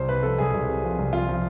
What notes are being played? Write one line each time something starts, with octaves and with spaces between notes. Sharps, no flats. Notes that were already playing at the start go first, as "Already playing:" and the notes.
Already playing: C2 C5
C3 B4
F3 A4
C2 G#4
C2
C3
F3
C2
F3 F4
F3